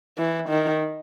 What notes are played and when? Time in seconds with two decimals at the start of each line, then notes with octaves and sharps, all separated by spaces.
0.18 E3
0.49 D#3